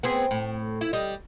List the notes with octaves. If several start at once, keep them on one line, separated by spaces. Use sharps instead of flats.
B3 C4 G#4
A2
E4
G3 D#5